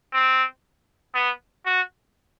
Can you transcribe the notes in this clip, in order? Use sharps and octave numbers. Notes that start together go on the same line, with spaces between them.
C4
B3
F#4